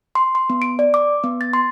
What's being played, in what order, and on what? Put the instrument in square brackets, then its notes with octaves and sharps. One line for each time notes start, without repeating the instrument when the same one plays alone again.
[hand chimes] C6
C6
B3
D7
D5
D6
B3
A6
C6